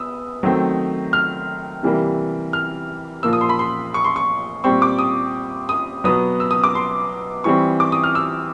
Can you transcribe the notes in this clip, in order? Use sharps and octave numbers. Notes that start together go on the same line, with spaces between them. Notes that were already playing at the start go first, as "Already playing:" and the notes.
Already playing: B3 D#6 E6
D#3 F#3 A3 C4
F6
C3 E3 G3 A#3
F6
A#2 F3 A#3 E6
D#6
C6
B5
C6
C#6
C6
C#6
A#2 G3 C4 C#6
D6
D#6
D#6
B2 F#3 B3 D#6
E6
D#6
D6
C6
E3 G3 C4 C#6
D6
D#6
F6
E6